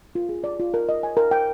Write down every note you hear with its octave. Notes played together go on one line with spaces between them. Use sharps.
F4
G#4
D5
F4
A#4
D#5
G#5
A#4
G5